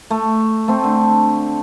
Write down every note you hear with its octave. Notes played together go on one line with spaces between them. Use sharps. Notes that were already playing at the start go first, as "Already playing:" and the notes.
A3
A3 C4
D3